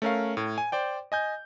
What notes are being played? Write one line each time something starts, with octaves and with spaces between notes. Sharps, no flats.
A3 C#4 A#4 F5
A2
G#5
C5 D5 G5
D#5 G#5 G6